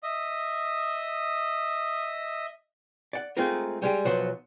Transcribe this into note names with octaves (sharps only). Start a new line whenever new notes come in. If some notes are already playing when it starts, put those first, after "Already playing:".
D#5 E5 D#6
D5 F#5
G#3 A3 C4 D#4 F4 A#4
G3 G#3 G4
B1 F3 F#3 B3 C5 F#5